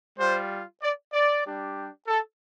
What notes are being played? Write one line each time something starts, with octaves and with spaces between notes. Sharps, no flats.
G3 F4 C5
D5
D5
G3 D4 G4
A4